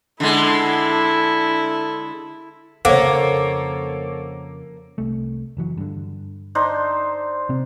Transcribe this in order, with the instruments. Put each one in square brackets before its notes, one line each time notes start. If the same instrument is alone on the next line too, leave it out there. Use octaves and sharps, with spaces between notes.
[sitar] D3 G#3 [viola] E4 [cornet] A4
[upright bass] F2 C#3 [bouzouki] A#3 [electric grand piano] A4 C#5 [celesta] C5 F#5 D6
[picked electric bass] C2 A3
F#1 E3 F#3
G2 D3
[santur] D4 D#4 C5
[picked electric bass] C3 C4